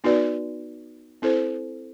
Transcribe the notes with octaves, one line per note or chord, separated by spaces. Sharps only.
B3 D#4 F#4 B4 D5
C4 E4 A4 C5